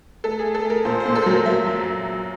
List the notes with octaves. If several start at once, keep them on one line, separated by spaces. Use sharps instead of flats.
A3 A4
G#4
A3
A4
A3
A#4
A#2 C5
C5
A#2
A4
F#3 A#4
F#3 E5
F#2